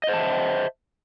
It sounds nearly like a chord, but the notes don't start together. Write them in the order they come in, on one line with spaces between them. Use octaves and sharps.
D#5 C5 A5 E5